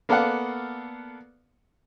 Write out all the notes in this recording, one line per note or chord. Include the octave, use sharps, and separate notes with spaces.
A#3 B3 A4 D5 F5 F#5